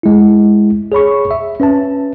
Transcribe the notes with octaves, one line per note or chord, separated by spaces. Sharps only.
G#3 E4
G#4 C#5 B5 C#6
E5
C#4 B4 E5 A5